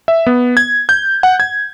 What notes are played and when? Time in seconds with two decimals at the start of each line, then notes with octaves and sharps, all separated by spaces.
0.08 E5
0.27 B3
0.57 G#6
0.89 G6
1.23 F#5
1.40 G#6